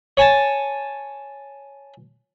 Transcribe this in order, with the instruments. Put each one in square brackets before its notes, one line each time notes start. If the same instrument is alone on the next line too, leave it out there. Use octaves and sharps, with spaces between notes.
[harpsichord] C#5 G#5 A5